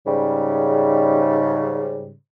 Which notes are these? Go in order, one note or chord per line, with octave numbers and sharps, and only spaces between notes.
G#2 C#3 G3